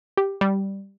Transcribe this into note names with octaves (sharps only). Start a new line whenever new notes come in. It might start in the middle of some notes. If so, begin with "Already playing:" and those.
G4
G3